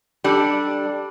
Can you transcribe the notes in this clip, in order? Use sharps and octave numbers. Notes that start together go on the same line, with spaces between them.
G3 D4 A4